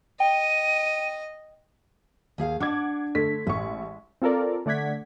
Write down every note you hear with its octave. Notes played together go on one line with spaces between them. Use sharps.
D#5 G5 D#7
D#2 G#4 F5
D4 F#5 D6 G#6
D3 A3 B6
A1 G#3 C#6
C4 F4 A4 A#4 D5
D3 A3 D5 F#5 G#6 B6